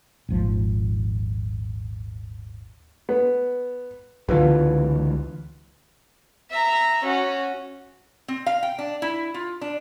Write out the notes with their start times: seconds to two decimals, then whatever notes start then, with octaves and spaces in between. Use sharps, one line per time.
0.29 D#1 G#1 F3
3.09 B3
4.29 C#2 D3 E3 B3 F4
6.51 E5 A#5
7.03 C#4 F#4
8.28 C4
8.46 F5
8.63 G5
8.78 D4
9.02 E4
9.34 F4
9.61 D4